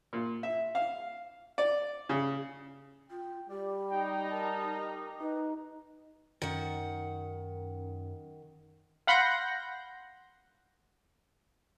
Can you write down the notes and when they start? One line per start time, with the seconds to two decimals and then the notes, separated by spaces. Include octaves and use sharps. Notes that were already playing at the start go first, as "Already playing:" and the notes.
0.13 A#2
0.43 E5
0.75 F5
1.58 D5
2.09 C#3
3.10 F4 G5
3.50 G3 G4 D5
3.91 D#4 G5 A#5
4.31 A#4 A5
4.83 G4
5.20 D#4 B4
6.42 F#2 D#3 F#5
9.07 F5 F#5 B5 C6 G6 A#6